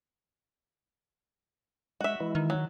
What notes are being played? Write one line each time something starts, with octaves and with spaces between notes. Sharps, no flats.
G#3 F#4 E5
E3 G#3 E4
D#3
F#3